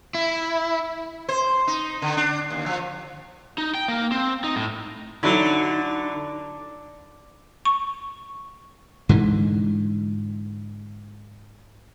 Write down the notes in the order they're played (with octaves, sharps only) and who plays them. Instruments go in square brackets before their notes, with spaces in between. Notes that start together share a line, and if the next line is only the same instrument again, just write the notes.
[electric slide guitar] E4
[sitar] C5
D#4
D3
D4
D#2
F3
[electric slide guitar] D#4
G5
A#3
C4
D#4
A2
[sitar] D3 [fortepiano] F#3 E4 [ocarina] D#4
[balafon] C#6
[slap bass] G#2 D3 E3